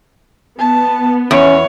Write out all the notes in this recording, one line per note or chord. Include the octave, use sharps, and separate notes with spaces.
B3 A5
E2 C#4 C#5